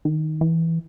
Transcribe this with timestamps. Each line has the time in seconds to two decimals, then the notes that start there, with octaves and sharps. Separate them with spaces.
0.05 D#3
0.41 E3